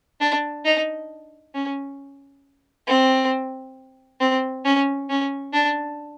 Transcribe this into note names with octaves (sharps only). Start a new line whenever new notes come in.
D4
D#4
C#4
C4
C4
C#4
C#4
D4